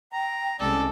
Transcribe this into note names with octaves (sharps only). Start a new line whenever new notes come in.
G5 A#5
C2 G#3 C#4 A4 D5